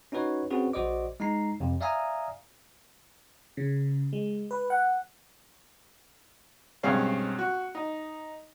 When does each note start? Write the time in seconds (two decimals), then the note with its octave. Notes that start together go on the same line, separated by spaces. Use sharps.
0.12 C#4 D#4 F#4 B4 C#5
0.50 C4 C#4 F#4 G#4 B4
0.73 A#1 F#4 C5 D5 D#5 D6
1.20 G#3 D#4 A#5 C7
1.60 F2 C3
1.81 D5 E5 F5 G#5 A#5 D#6
3.57 C#3
4.13 G#3
4.51 B4
4.70 F#5
6.83 B1 G2 G#3 C4 C#4 F5
7.39 F#4
7.75 D#4